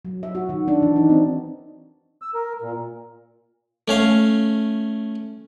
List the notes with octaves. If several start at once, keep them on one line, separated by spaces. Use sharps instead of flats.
F#3
E5
F#4
D#3
D4
E3
D#4
C4
E6
A#4
A#2
A3 C#4 F5